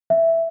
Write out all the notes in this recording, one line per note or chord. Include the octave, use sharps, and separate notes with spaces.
E5